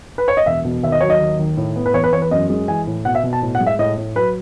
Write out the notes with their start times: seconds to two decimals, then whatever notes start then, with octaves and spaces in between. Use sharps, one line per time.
0.18 B4
0.28 C#5
0.37 D#5
0.46 E1 E5
0.65 B2
0.83 D#2 E5
0.92 D#5
1.01 F#3 C#5
1.10 D#5
1.20 D#2
1.39 D#3
1.57 A2
1.76 B3
1.86 B4
1.94 E2 C#5
2.04 B4
2.13 E2 C#5
2.22 B4
2.31 F#2 D#5
2.50 G#3
2.68 E3 G#5
2.87 A2
3.05 B2 F#5
3.15 E5
3.23 B2
3.33 A5
3.42 A2
3.55 F#5
3.60 G#3
3.66 E5
3.79 A2 D#5
3.98 A2
4.16 F#3 B4